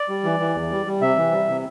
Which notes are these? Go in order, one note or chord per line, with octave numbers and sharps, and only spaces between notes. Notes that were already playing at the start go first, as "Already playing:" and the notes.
Already playing: D5
G3
E3
E3
E2
G3
G3
C3 E5
E3
G3
C3